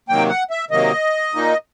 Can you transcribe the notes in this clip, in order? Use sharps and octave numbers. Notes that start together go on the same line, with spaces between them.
C3 D#3 F#3 A#3 G5
F#5
E5
C3 D#3 F#3 A#3 D#5
A#2 F3 A#3 D#4